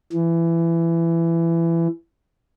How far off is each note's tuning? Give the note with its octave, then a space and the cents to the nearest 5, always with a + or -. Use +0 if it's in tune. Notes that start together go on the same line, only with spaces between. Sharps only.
E3 +20